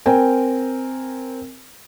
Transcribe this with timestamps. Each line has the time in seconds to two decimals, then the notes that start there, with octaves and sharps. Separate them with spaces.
0.06 C4 A#4 G5 G#5